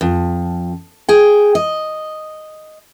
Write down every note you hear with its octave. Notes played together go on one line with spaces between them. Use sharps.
F2
G#4 G5
D#5